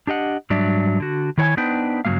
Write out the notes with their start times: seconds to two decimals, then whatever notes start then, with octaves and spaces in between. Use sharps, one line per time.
0.07 D4 G4 D#5 F#5
0.50 G#2 F#3 G3 D4 D5 E5
1.00 D3 F#4
1.38 D#3 E4 C#5 F#5 G#5
1.57 B3 D4 D#4 B4 C5 G5
2.05 G2 C#3 F#3 G#3 A#3 F5